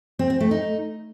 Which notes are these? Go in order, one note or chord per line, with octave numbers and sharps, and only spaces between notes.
C4
C4
A3
D#4